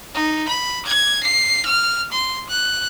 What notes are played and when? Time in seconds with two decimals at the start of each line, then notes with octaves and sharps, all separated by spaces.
0.14 D#4
0.48 B5
0.86 G#6
1.23 C7
1.66 F6
2.12 C6
2.49 F#6